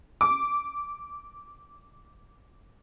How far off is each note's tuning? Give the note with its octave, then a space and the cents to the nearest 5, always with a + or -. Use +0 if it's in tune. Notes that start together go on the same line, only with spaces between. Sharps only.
D6 -15